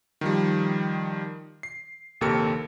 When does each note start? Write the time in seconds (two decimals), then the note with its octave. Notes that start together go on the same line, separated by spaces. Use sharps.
0.21 D#3 F3 G3
1.63 C7
2.21 A#1 D#2 C3 A4 A#4 C#7